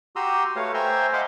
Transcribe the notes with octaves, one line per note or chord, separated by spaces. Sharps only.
F#4 G4 A#5 C6 D#6 E6
A3 B4 C#5 F5
C5 E5 G5 G#5 A#5 C6
D#5 F5 F#5 B5 C6 D6